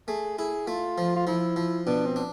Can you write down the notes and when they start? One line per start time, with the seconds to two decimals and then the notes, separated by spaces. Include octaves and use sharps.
0.08 A3 G#4
0.38 E4 G#4
0.67 A3 F4
0.98 F3
1.16 F4
1.27 F3 E4
1.56 F3
1.86 B2 D4
2.06 C4
2.16 D4